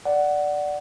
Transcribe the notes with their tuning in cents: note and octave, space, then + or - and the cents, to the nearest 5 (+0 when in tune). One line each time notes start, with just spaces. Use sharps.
D5 +0 F#5 +10